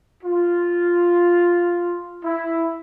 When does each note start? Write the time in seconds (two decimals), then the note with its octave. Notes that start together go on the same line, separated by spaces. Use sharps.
0.22 F4
2.23 E4